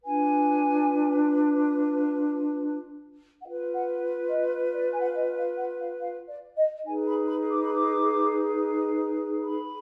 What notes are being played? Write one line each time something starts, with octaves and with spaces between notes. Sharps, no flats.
D4 F4 B4 G#5
F4 B4 F#5
F#5
D#5
D5
G#5
F#5
F5
D#5
F5
F#5
F5
F5
D5
D#5
D#4 G#4 B4 G#5
B5
B5
D6
B5
D6
B5